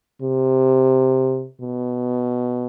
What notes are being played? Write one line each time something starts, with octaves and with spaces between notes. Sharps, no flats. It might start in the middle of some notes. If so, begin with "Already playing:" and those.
C3
B2